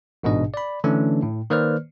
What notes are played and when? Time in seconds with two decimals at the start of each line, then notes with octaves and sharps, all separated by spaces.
0.23 A1 G#2 B2 D4 D#5
0.54 D5 B5
0.84 D3 E3 A3 C#4 D4
1.23 A2
1.50 D#3 A#3 B4 C5 D5 F6